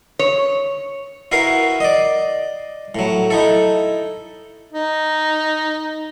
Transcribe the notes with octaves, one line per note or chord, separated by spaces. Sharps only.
C#5
E4 F#4 A#4 B4 F5 C6
D5 D#5
A2 F#3
D#4 E4 A4
D#4